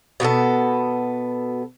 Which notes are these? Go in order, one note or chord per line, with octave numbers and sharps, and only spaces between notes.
B2 B3 F#4 A4